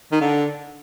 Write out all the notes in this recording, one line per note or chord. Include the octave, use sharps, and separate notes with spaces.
D#3
D3